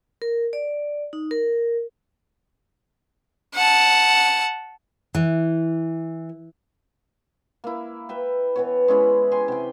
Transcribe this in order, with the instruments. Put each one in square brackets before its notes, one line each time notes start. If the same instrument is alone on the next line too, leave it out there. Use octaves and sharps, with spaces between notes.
[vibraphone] A#4
D5
D#4
A#4
[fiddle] F#5 A5
[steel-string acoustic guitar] E3
[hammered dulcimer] A#3 E4
B4 E5 G5
E3 B3 C#5
G#3 C#4 E4 D5
G4 G#4 G#5 C6
C3 G5